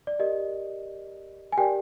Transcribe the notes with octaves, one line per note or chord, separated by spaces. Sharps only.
D5
G4 A#4 D5 D#5
G#5
G4 A#4 D5 G5